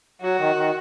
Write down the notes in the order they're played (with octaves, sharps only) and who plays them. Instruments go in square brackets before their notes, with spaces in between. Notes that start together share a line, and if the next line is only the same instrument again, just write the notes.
[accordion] F#3 [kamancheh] F#4
[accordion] D#3
D#3